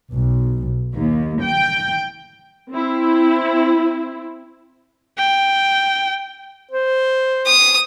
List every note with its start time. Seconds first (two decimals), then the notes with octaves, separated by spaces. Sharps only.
0.12 B1
0.93 D#2
1.43 G5
2.71 C4 E4
5.18 G5
6.72 C5
7.47 D#6